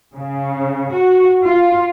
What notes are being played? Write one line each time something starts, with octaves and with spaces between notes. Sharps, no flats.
C#3
F#4
F4